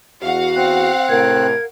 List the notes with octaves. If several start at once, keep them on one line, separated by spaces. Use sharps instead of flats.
E2 F#4 F5 F#5
C4 F#6
A2 C3 A#4 G#6